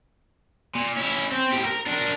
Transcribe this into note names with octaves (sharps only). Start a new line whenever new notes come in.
A#2
C#4 E4
C4
A2 G4
A#4
D4 A#4